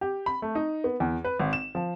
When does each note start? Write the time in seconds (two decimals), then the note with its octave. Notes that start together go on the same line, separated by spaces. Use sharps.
0.01 G4
0.26 B5
0.42 A3
0.55 D#4
0.84 B3
1.00 E2
1.24 B4
1.40 G#1
1.53 E7
1.75 F3